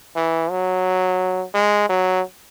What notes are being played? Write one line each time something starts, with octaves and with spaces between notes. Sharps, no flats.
E3
F#3
G#3
F#3